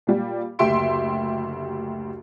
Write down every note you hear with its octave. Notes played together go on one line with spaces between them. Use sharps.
A#2 G3
F#1 D2 G4 E5 C6 D7